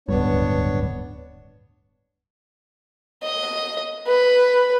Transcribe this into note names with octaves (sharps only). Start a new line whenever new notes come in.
D1 C#2 G2 B3 D4 C#5
D#5
B4